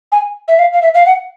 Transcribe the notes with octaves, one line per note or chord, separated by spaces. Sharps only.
G#5
E5
F5
F5
E5
F5
F#5